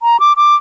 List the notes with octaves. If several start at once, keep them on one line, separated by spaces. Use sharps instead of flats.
A#5
D6
D6